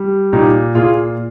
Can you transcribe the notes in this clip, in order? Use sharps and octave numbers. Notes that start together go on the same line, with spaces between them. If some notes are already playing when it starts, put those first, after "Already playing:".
Already playing: G3
A#2 D#4 G4
A#2 F4 G#4